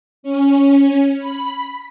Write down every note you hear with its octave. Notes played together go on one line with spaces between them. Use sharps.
C#4
B5